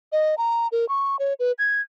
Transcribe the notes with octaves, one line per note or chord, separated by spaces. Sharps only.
D#5
A#5
A#4
C#6
C#5
B4
G#6